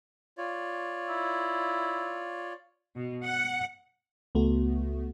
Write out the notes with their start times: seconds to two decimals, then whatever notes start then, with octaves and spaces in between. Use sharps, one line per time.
0.38 F4 C#5 D5
1.09 E4
2.96 B2
3.26 F#5
4.35 C#2 A3 B3 F#4